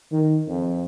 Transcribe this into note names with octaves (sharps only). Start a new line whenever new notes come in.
D#3
F2